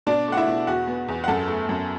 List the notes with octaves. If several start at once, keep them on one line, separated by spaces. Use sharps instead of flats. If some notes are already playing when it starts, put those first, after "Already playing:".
B2 D4 D5
A3 F#5
E4 E5
B2
E2 F#4 F#5
B3
E2
F#5
F#2 A4 A5
A3
F#2